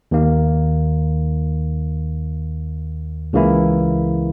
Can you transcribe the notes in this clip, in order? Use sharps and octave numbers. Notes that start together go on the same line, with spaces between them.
D#2 D#3 A#3
C#2 C#3 E3 A#3 E4